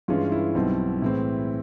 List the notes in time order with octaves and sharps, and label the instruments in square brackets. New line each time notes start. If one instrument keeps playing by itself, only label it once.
[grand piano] G2 E3 G#3 C#4 F4
E4
B1 B2 G3 C4 D#4
A2 E3 G#3 C4